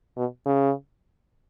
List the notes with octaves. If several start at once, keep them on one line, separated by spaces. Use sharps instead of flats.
B2
C#3